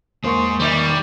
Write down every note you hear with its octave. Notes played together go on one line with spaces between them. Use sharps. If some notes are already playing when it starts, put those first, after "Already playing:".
E2 G#3 A#3 C5 C#6
D#3 G3 D#4 E5